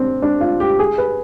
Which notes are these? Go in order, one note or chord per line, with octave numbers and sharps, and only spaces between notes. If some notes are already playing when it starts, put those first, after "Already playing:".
Already playing: C4 D4
D4
F4
G4
G#4
B4